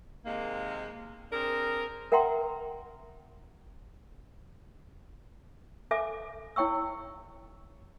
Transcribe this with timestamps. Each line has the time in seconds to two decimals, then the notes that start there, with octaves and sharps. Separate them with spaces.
0.25 C3 D#3 G#3 A#3
1.31 C4 D4 G#4 A#4
2.12 A#4 E5 F#5 G5 A#5 C6
5.91 A4 E5 G#5 D6
6.56 E4 C#5 G5 C#6 E6